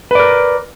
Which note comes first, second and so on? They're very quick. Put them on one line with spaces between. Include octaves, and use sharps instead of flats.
B4 D5 A#4